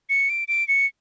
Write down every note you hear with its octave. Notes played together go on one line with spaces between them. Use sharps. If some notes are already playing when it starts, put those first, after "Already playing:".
C#7
D7
D7
C#7